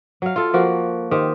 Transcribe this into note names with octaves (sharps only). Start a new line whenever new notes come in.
F#3 F5
F4 A4
F3 A#3 F#4
D#3 G4 C5